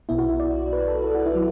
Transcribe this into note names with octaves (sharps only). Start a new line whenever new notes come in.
B1 B2 B3 E4
F#4
E4
D5
B4
A4
A4
F#4
E4
F#3